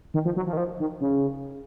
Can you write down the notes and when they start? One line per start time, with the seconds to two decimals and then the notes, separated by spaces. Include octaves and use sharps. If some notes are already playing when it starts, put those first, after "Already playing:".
0.14 D#3
0.25 F3
0.36 F#3
0.47 F3
0.53 D#3
0.57 F3
0.80 D#3
1.00 C#3